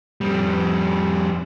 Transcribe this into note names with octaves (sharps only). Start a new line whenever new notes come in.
F2 G3